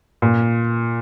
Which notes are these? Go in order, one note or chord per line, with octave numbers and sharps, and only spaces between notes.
A#2